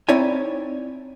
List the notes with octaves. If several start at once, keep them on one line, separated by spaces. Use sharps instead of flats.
C4 D#4 E4 C#5 D5 G#5